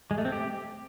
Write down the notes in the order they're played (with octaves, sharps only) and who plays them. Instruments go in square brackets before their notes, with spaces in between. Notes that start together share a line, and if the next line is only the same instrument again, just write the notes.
[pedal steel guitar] G#3
A3
C4
G4